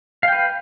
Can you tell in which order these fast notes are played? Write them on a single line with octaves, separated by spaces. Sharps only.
F5 G5 B4